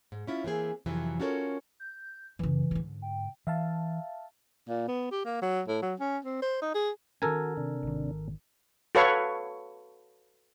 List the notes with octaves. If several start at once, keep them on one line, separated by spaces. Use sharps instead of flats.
G#2
C#4 E4 F4
E3 A#3 C4 G#4
F2 C3 E3 F#3
C#4 F4 F#4 A4 A#4 C#5
G6
F#2 C#3 E3
G#2 D3
G5
E3 E5 F5 A5
A#2
B3
G4
A#3
F#3
A2
F#3
C#4
C4
C5
D#4
G#4
D#3 C#4 F#4 A4 A#4 G#5
C3 D4
G#1 D#3
F#4 A4 B4 C#5 F5 C#6